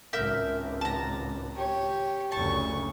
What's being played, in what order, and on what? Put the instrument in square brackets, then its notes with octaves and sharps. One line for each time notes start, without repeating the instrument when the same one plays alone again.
[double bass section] G#1 C#2 [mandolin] A#4 E5 G6
[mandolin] A5 A#5
[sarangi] G4 [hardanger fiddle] C#5
[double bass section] F#1 D2 C#3 [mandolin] A5 [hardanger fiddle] C#6